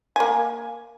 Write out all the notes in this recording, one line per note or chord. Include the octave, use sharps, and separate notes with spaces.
A#3 G#5